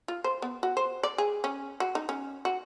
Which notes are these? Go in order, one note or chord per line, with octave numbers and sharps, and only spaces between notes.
F4
C5
B3
F#4
C5
D5
G#4
C#4
F#4
D#4
C#4
F#4